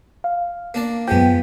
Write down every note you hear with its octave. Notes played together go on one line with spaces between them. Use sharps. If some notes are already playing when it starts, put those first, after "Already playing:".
F5
A#3 D4 D5
F#2 F3 G#3 B3 G5